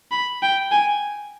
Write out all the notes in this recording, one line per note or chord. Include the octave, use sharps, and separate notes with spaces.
B5
G5
G#5